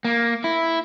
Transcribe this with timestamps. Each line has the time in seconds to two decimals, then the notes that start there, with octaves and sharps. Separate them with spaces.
0.05 A#3
0.44 E4